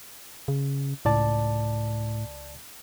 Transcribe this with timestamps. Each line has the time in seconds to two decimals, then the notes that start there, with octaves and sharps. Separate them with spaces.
0.48 C#3
1.05 C#2 A2 D5 A5